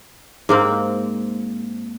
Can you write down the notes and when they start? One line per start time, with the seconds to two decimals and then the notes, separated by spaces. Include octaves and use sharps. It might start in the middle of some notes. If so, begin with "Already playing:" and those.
0.49 G#2 A#3 C4